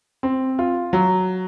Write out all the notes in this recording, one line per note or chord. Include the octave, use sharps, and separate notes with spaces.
C4
F4
F#3